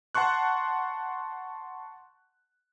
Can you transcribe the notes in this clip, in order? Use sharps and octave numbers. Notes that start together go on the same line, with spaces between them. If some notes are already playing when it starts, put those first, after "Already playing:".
F#5 A5 C6 C#6 F#6